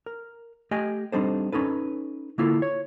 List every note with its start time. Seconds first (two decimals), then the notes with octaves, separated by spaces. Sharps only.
0.06 A#4
0.71 A3 G4 D#5 G5 G#5
1.12 G3 C4 D4 D#4 A4 C5
1.52 C#4 D#4 A4 B4
2.38 D3 A#3 E4 F4 A4
2.62 C#5